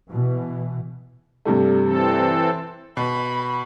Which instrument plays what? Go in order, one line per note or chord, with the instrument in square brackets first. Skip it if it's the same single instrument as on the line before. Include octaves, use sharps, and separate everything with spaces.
[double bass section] B2 E3
[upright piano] G2 C3 A3
[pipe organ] E3 C4 A4
[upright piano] B2 [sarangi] B5